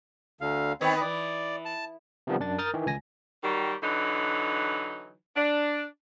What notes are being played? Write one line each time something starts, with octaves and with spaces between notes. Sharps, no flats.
D2 D3 F5
D#3 B3 C4 B4 C#5
E3 D5
A5
C3 D#3 F3 G3 B3
F#2 D4 A6
A#4 D#6 F6 G6 A6
D#3 E3
C#2 G#5 A#6
D#3 F#3 G3
D3 E3 F#3 D#4
D4